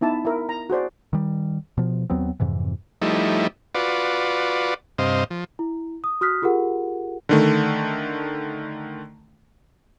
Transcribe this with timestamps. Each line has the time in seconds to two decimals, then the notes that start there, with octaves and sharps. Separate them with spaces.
0.01 B3 D#4 E4 A5
0.25 E4 A#4
0.49 A#5
0.70 F#4 G#4 C5 D5
1.13 D#3 G3
1.77 B2 F3
2.10 D#2 F#3 B3 C4
2.40 F2 G#2 C3 E3
3.02 F3 G3 A3 D#4 E4
3.75 F4 F#4 B4 D5
4.98 G2 C3 C5 D#5 F5
5.30 F3
5.59 E4
6.04 D#6
6.21 F#4 D#6 F6 F#6 B6
6.42 F4 G4 G#4 A#4 F#5
7.29 D3 D#3 A3